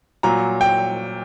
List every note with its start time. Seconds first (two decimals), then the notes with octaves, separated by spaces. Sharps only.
0.23 A#2 F#3 A#5
0.61 G5